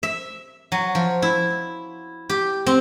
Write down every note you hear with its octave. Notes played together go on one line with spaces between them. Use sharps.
E5
F#3
F3
E4
G4
C4